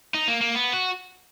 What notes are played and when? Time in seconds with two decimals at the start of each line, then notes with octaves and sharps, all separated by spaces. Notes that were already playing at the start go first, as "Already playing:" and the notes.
0.14 D#4
0.28 A#3
0.41 A#3
0.55 B3
0.73 F#4